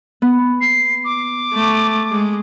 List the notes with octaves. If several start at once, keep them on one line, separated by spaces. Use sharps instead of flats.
B3
C7
D6
A3
G#3